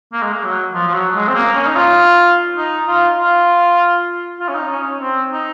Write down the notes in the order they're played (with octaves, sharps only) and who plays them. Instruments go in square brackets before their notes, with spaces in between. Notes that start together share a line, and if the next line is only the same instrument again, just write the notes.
[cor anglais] A#3
G#3
A#3
F#3
F3
F3
F#3
G#3
C4
A#3
C#4
D#4
F4
D#4
F4
F4
F4
C#4
D#4
C#4
C4
D#4